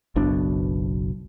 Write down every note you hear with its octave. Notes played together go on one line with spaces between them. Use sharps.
F#1 B1 B2 D4